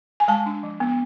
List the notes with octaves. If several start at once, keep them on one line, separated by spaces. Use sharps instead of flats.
G#5
G#3 A5
D4
F3
B3